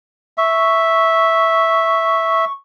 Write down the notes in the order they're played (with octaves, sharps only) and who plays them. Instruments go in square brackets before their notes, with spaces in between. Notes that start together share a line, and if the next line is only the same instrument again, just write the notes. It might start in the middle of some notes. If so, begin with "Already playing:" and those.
[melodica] E5 [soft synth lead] C#6